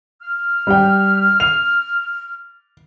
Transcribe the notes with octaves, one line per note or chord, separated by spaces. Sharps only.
F6
G3 G5
F7